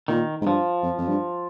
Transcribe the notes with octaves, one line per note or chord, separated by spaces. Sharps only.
A#2 D#3
G#2
G2 F3
F2
F2
G2